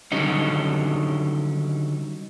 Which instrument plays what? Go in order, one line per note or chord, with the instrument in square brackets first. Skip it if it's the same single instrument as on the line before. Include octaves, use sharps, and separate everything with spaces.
[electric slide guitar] D3 D#3 F#3 G3 C#4 D#4